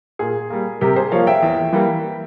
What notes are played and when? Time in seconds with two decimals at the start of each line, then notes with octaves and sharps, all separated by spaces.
0.19 A#2 G#4
0.50 G3 A#3
0.81 C3 G4 A#4
0.96 G#4 C5
1.12 F3 A#3 C#5 F5
1.27 E5 G5
1.42 E2
1.73 E3 G3 A#3